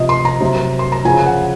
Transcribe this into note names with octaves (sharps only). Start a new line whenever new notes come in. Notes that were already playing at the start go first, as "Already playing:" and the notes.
Already playing: C3 F3 D#5
C6
A#5
C3 F#3
C6
A#5
C#3 F3 G#5
F#5